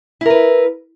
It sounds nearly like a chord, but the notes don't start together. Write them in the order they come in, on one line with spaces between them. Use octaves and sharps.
E4 A#4 B4